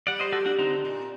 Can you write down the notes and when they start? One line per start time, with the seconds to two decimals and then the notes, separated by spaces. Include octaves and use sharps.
0.07 G3 D5 F#5
0.20 C5 D#5
0.32 F#4 A4
0.45 D4 F#4
0.59 D3 C4 D#4
0.85 A#2